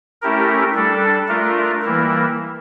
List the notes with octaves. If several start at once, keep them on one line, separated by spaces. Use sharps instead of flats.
A3 C#4 E4 G4 A#4
G3 D4 A4
A3 D4 F4 A#4
E3 G3 A#3 E4 A#4